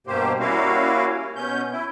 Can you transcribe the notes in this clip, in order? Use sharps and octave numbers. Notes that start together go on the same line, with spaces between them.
G2 B2 A#3 G4 C5
G3 A#3 C#4 E4 F#4 F5
B2 C#4 G6
E4